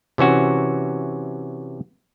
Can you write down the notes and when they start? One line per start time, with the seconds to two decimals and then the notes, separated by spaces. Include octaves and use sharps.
0.18 C3 E3 C#4 F#4